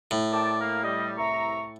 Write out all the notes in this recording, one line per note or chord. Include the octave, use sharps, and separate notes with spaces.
A2
A#4 D5 G5 A5
A#3 A#4
G3 D#5
C2 E5 A#5 C#6